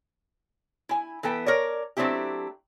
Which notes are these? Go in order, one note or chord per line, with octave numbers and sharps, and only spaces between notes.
E4 G#5
E3 B3 A4 G5
A#4 C#5 D5
F#3 A3 C4 D4 E4 G4